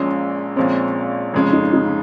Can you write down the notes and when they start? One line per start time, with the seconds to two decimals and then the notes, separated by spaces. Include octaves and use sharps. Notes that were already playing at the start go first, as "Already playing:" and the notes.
Already playing: A#1 A#2 G#3 C#4
0.56 A#1 A#2 G#3 C4 C#4
1.33 F1 F2 C#3 G#3 C#4
1.53 D#4
1.73 D#4